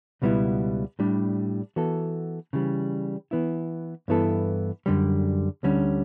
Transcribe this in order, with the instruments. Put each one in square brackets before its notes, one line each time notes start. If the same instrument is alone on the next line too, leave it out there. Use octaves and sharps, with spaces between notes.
[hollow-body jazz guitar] C#2 B2 G3 B3 E4
A2 G3 D4
E3 B3 F#4 A4
C#3 E3 G3
E3 B3 E4
G2 E3 B3 E4 A4
F#2 D3 G3
D2 D3 G3 C#4